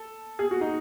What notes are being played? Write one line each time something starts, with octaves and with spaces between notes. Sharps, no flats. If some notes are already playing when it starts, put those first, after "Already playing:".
Already playing: A4
G#4
F#4
D#4